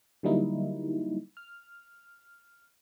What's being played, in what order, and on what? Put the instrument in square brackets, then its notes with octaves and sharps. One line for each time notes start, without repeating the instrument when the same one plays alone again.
[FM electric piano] D3 F#3 G3 A#3 D#4 E4
F6